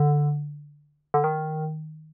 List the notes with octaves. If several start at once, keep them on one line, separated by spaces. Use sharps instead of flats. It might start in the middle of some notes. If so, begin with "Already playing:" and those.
Already playing: D3
D3
D#3